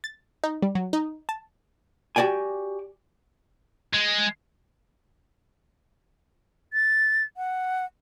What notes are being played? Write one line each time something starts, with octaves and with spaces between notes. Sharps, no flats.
A6
D#4
G3
F#3
D#4
A5
F#4 G4 D5 G5 G#5
G#3
A6
F#5